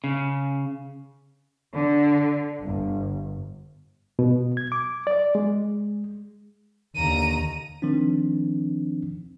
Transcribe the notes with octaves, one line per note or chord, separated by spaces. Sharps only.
C#3
D3
G1
B2
G#6
D6
D5
G#3
D#2 D3 A#5 D#7
D#3 F3 C4 D4